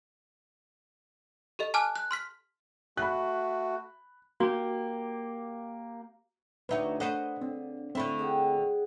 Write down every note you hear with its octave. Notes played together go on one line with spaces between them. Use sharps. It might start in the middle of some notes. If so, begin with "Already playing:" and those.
G4 A4 D#5
G#5 A5 D6 F6 F#6
F#6
C6 F6 B6
A3 F#4 B5 F#6
A#3 F#4 G4
D2 D#4 F#4 B4 C#5 D5 E5 F5
A4 B4 C5 D#5 F#5
D3 C4
D3 A3 C4 E4 C5 F5 B5
G#4 F#5 G5